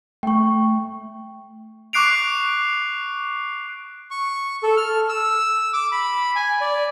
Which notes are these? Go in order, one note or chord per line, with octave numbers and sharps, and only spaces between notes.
A3 G5 C#6
C#6 D6 F#6 C7 D7 F7
C#6
A4
F6
E6
D6
B5
G#5
D5